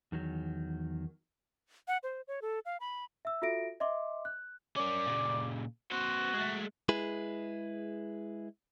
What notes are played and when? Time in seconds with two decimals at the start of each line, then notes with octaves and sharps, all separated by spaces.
0.12 E2 D#3 F#3
1.88 F#5
2.03 C5
2.28 C#5
2.42 A4
2.65 F5
2.80 B5
3.25 E5 E6
3.42 F4 F#4 A4 E5 A#6 D7
3.80 D#5 E5 C6 D6
4.25 F#6
4.76 C#4 A#4 D5
5.06 A#2 C#3
5.92 B3 F#4 C5
6.34 G#3 A3
6.89 G#3 E4 G#4 B4